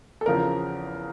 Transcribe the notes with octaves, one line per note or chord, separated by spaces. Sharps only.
A4
E2 C#3 F3 A#4